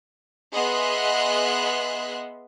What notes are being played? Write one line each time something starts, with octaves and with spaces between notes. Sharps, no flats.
B3 G#4 D#5 E5 C6 F#6